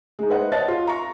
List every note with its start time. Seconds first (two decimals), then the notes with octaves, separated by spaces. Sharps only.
0.19 G#3 D#4
0.30 B4 C5 D#5 F#5
0.52 C#5 D#5 A5 A6
0.68 F4
0.87 A#5 C#6